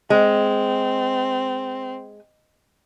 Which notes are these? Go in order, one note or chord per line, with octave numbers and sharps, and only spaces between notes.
G#3 C4